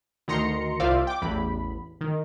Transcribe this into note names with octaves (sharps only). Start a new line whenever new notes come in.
D2 D#3 A#5 C6 C#7
C2 F4 C5 D5 E5 F5
G5 D6
A1 E2 B5
D#3